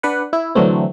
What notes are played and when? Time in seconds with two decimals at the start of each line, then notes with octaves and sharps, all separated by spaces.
0.03 D4 B4 F#5
0.33 E4
0.55 D3 E3 F#3 A3 C4